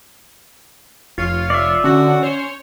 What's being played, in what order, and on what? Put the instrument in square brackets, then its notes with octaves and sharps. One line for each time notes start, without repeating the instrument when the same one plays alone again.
[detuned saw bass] F1 [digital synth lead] F4 [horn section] C#5 F5
[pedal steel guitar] D5 E5
[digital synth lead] D3 [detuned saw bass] C#4 [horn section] F#4
[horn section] C5 [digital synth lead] C#5